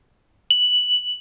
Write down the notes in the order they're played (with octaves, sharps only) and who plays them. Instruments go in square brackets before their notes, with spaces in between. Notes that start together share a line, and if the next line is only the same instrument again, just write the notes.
[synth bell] F#7